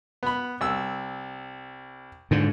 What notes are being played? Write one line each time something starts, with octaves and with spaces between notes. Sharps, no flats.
B3 B5
C2 E6
G#2 D3